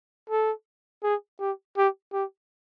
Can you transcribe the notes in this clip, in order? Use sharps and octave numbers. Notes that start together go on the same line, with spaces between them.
A4
G#4
G4
G4
G4